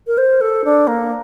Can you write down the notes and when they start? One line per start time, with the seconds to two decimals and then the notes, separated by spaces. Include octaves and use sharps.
0.07 A#4
0.18 C5
0.41 A4
0.65 D4
0.87 A#3